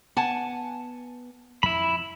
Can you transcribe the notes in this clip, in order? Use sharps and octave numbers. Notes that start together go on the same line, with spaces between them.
B3 F#5 G#5 A5
F2 E4 B5